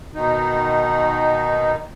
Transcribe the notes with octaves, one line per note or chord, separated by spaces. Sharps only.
B2 D#3 D#4